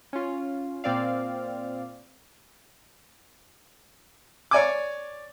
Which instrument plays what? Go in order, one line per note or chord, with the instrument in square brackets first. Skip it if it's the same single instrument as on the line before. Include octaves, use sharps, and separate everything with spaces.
[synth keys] C#4 F4
A#2 C4 D5 F5
[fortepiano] C#5 D5 G#5 D6